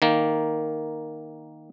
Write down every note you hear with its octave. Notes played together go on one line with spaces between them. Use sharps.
D#3 A#3